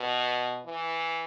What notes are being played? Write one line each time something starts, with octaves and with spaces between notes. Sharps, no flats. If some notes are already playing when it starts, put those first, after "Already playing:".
Already playing: B2
E3